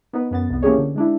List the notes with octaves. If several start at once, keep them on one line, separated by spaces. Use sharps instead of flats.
B3 D#4 B4
F#2 B3 A6
C2 B3
E3 A#3 C#4 G4 G#4 C#5
D3
G#3 D4 E4